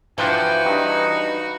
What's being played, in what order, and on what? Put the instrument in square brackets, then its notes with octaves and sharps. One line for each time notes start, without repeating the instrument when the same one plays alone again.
[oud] E3 [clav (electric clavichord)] F3 D4 [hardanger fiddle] F#4 B4 [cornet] G5
[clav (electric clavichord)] G2 [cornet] D#4